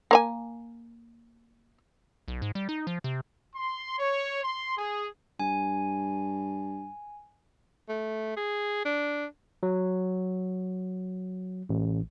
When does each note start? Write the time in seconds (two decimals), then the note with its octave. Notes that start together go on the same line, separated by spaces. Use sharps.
0.11 A#3 C#5 G#5
2.28 B1
2.42 G#2
2.55 G3
2.69 D#4
2.87 F3
3.04 C3
3.56 C6
3.99 C#5
4.43 C6
4.77 G#4
5.40 G2 G#5
7.89 A3
8.37 G#4
8.85 D4
9.63 F#3
11.69 A1